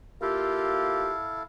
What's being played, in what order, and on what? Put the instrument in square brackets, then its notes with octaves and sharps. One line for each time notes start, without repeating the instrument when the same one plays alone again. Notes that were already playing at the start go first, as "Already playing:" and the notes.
[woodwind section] A#3 F4 G4 [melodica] E4 A4 F5